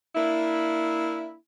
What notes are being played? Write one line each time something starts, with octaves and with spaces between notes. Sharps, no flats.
A#3 D4 E4